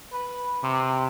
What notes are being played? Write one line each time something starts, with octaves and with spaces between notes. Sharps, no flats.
B4
C3